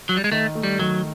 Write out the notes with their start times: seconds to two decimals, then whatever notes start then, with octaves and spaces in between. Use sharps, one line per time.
0.09 F#3
0.17 G3
0.24 G#3
0.32 D#3 A3
0.55 A3
0.63 G3
0.79 D#3 F#3